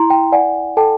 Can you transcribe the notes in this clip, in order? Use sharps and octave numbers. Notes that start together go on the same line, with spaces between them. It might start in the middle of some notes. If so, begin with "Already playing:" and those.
Already playing: E4 A#5 C6
G5
D5 F#5 G#5
A4 G5 A5